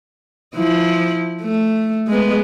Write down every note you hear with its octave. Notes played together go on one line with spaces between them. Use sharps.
F3 E4
A3
G#3 B3